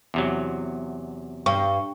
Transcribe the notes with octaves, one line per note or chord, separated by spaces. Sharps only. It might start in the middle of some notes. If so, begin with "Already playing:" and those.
E2 C3 F#3
G2 C#6